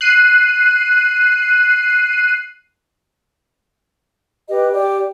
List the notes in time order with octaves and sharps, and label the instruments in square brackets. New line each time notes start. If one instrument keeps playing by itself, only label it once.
[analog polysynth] F#6 C7 D#7
[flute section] G4 B4 D#5
G4 D5